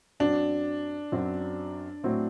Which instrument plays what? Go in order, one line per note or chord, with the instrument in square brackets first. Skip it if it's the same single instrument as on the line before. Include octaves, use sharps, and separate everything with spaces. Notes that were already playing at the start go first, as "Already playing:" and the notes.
[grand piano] F#2 F#3 C4 F#4 [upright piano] D4
[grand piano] F#2 F#3 C4 F#4
A2 F#3 C4 E4